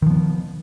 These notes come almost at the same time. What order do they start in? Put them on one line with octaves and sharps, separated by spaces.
D#3 F3 B3